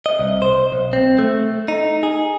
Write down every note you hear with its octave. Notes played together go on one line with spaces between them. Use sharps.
D#5
C2
C5
B1
C4
A3
D#4
G#4